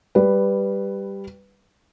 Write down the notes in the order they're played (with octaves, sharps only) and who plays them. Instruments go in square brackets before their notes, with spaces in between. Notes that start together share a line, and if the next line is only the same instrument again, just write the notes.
[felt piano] G3 B4